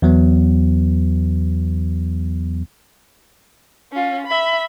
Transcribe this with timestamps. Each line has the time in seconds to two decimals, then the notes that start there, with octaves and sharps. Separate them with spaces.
0.02 E2 F#3 B3
3.92 C#4 F4
4.27 E5 B5